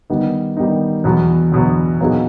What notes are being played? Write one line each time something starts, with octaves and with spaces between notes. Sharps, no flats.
D#3 G3 B3 D#4
D#3 G3 B3 D#4
E2 B2 F#3
E2 B2 F#3
A#2 F#3 B3 D#4 G#4